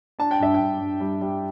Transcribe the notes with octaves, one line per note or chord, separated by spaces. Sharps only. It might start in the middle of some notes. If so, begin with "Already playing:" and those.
D4 A5
G5
G2 E5
G5
G2
G2
G3
G3